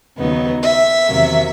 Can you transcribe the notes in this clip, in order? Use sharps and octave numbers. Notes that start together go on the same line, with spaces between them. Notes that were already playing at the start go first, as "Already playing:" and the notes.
D#2 C#3 F#3 B3 D#4
E5
E2 C3 D#3 F#3 A#3